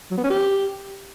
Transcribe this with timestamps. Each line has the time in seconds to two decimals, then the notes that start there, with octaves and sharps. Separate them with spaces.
0.11 F#3
0.17 B3
0.24 C#4
0.30 G4